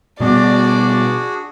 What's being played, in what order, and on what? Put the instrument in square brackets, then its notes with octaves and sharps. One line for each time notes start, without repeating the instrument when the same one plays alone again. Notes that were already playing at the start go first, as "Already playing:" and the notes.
[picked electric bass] B2 G3 B3 [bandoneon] D4 F#4 G#4 [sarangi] D5